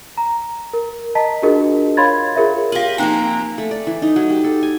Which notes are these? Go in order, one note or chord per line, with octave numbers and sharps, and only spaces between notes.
A#5
A#4
D#5 A5 A#5 B6
D4 F4 F#4 G#4 A#4 D#5
C#5 F5 B5 C6 G#6 A6
F4 G#4 A#4 C#5 E5
F4 G4 F5 F#7
F3 A#3 C4 D#4 G5 G#5 A#5
A3
D5
E3
D#4
F#3
G4
A4
G#5